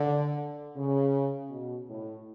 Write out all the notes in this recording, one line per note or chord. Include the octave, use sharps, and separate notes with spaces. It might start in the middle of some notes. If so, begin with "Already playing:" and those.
Already playing: D3
C#3
B2
A2